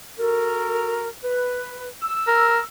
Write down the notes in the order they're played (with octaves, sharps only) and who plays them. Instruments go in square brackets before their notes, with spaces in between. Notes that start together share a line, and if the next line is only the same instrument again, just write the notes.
[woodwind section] F#4 A4 A#4
B4
E6
[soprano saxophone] A#4